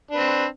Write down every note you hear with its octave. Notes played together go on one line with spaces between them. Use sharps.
C4 D4 B4